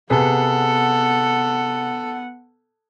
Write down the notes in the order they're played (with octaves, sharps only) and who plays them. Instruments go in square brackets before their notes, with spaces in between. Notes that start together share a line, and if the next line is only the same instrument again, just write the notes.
[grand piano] C3 G#4 B4 [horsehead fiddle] B3 F#5 [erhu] A4